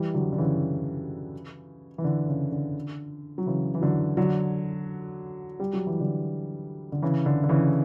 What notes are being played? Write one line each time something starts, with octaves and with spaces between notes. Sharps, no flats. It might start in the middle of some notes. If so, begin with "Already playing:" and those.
Already playing: E3 G3
D3 F#3
D3
C#3 E3
E3
D3
C#3
D3
F#3
C#3 E3
E3
D3 F#3
D3 F#3
G3
F#3
E3
D3 F#3
D3
C#3 E3
D3
D3
C#3 E3